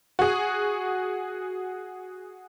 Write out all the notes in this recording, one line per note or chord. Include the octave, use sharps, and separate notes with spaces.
F#4 G#4